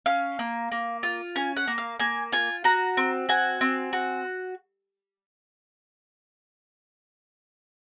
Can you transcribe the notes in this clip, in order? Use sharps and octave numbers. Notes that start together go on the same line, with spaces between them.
C#4 F5
A#3
A#3
F4
C#4 G#5
F#5
A#3
F5
A#3 G#5
F4 G#5
F#4 A#5
C4
F#4 G#5
C4
F#4